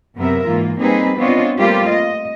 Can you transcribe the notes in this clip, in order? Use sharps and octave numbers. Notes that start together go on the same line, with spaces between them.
F#2 C3 B3 C4 A#4 E5
G#2 E3 A#3 F4
G3 A#3 C4 D#4 G#4 B4
B3 C4 D4 F4 C#5 D#5
G3 A3 A#3 C4 F4 G4
D#5